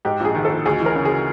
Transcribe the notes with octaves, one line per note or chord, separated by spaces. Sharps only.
G#2 G4
A#1 G#4
D#3
A#1 A4
D2 G#4
E3
A#4
C#3
G#4